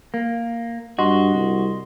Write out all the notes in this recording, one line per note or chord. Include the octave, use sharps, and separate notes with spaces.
A#3
G2 F#4 D#5 C6
C2